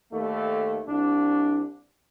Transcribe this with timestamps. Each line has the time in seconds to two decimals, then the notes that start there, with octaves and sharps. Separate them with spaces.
0.12 D#2 A3
0.88 C2 D4